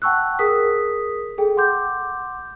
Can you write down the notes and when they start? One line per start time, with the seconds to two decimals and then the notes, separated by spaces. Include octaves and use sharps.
0.02 F#5 G5 A5 C#6 E6 F#6
0.39 G#4 A#4 D#6 B6
1.38 G#4 A4 G5
1.57 F#5 C6 D6 G6